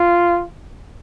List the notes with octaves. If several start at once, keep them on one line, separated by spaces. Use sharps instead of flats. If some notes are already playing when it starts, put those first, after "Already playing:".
Already playing: F4